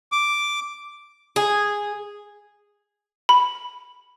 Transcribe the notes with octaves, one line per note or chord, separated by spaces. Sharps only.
D6
G#4
B5